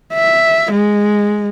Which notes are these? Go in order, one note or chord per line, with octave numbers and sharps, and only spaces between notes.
E5
G#3